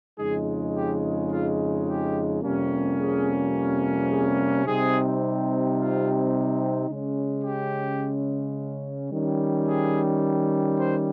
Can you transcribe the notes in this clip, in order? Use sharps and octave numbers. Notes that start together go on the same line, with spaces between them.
F2 C#3 G#3 D#4 G#4
G4
F4
G4
F2 C3 G3 A#3 C#4
G#4
G#4
C3 G3 C4 D#4 G#4
F4
C#3 G#3 C#4
G4
D#3 G3 C#4
G#4
C5